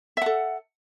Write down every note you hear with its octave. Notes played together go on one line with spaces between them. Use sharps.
A4 E5 F#5